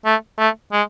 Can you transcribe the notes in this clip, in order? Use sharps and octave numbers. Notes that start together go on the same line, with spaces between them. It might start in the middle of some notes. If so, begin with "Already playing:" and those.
A3
A3
G#3